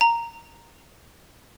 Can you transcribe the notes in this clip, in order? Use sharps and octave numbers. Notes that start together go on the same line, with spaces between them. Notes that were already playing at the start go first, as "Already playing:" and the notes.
A#5